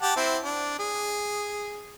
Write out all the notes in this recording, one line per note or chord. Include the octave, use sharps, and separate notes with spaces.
G4 F#5 A5
C4 E4
D4
G#4